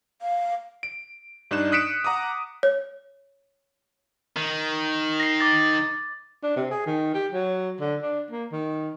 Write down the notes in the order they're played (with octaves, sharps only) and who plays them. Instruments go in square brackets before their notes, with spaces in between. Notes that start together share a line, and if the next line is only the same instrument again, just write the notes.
[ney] F5
[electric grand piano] D7
G2 D4 D#4 F#6 E7
D#6 F#6 B6 C#7 D7 E7
F#5 A#5 D6 D#6
[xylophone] C#5
[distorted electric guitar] D#3
[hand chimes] A#6 C7
D6 A6
[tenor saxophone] D4
C3
G#4
D#3
G4
F#3
D3
D4
A#3
D#3